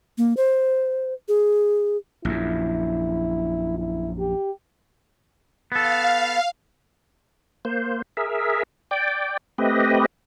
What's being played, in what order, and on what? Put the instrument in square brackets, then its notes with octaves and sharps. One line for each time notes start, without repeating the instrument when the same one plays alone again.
[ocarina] A#3
C5
G#4
[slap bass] A#1 F#2 [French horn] E4
[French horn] E4
G4
[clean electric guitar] B3 A4 [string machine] F5
[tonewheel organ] A#3 C5
G#4 A#4 E5
D5 G5
A3 C4 G4 B4 D#5